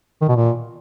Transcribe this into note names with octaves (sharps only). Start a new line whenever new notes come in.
D#3
B2
A#2